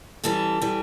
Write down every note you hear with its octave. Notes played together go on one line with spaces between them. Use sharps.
F#2 E3 G3 A4
E3 G3